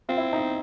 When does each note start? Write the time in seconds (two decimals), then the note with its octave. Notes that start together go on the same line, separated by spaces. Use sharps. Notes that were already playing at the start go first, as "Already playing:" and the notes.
0.09 C4 F4
0.17 E4
0.33 D#4